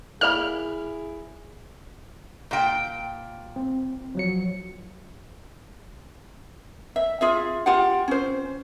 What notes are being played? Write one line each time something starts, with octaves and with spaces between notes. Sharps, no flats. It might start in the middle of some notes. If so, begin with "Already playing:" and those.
A#3 E4 G#4 D5 B5 F6
A#2 G5
C4
F3 F#3 C#7
E5
F4 G#4 E5
F4 G4 F#5
C#4 C5